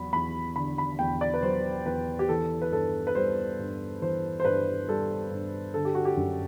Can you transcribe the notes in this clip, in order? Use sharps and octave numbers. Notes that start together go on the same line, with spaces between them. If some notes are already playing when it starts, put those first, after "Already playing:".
Already playing: E2 F#3 B5
E2 B5
D3 B5
B5
E2 G5
D5
B4
F#3 C5
E2 B4
G4
E3 A4
B4
G2 A4
B4
G3 C5
G2
E3 C5
C5
G2 B4
G3 A4
G2
D3 A4
G4
F#4
G4
F#2